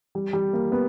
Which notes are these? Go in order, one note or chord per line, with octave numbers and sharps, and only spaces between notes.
G3
G3
A#3
B3